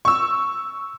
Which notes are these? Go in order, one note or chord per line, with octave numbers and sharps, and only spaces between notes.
C#6 E6